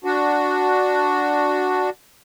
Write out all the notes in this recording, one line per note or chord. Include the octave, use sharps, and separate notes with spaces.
D4 F#4